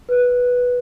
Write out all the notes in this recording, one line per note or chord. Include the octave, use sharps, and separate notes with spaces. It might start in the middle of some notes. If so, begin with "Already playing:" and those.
B4